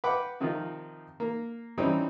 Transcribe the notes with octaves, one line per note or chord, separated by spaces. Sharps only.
B4 F#5 G5 D6
C3 D#3 F3 D#4 F4
A#3
E3 G3 C4 C#4 D#4